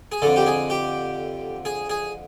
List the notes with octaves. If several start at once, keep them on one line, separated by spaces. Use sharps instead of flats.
G#4
F2 D3 A4
G4
G#4
G4
G#4
G#4